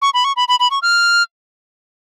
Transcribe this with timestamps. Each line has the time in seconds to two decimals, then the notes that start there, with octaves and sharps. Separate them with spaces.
0.02 C#6
0.14 B5
0.24 C#6
0.36 B5
0.48 B5
0.60 B5
0.71 C#6
0.82 F6